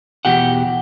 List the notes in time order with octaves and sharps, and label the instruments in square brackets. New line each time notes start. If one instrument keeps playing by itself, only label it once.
[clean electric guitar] E2 B2 G4 F#5